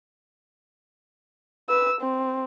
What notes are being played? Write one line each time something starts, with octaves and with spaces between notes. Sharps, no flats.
B4 E6
C4